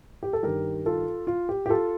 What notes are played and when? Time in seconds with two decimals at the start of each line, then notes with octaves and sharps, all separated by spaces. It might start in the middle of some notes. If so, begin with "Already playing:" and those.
0.23 G4
0.33 A4
0.43 G2 D#3 G4 A#4
0.86 F4 A4
1.27 F4
1.49 G4
1.66 G4
1.69 F4 A4